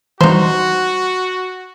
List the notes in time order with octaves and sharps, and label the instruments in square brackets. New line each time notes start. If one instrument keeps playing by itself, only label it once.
[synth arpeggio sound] E3 G3 [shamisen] D#4 C5 [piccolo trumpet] F#4